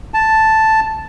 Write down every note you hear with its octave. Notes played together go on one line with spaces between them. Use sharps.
A5